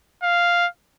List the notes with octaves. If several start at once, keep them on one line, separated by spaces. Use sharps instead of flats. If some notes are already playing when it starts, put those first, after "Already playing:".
F5